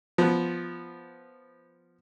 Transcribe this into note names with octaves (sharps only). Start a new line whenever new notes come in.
F3 B3